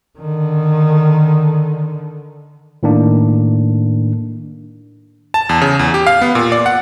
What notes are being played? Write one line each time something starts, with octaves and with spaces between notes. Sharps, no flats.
D3 D#3
A2 D#3 A#3 D4
A5
E2
C#3
E2
G4
F5
B3
A#2
D5
F#5